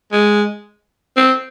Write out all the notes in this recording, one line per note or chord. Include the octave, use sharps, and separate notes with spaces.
G#3
C4